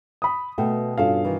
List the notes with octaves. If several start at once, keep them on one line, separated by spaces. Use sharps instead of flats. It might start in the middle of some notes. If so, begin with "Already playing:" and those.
B5 D#6
B2 A3 F#4 G5
G2 B2 C#4 F4 A4 F5
D#3 E3